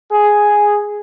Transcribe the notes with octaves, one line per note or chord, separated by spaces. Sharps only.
G#4